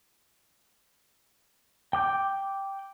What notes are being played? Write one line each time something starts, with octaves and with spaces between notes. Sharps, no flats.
G5 D6 G6